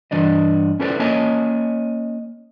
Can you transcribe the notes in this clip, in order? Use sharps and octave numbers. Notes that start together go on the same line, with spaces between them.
G2 E3 D4 D5 D#5
C#4 E4 A4 B4 C5 D5
A#3 C#4 C#5 D#5 G#5 A5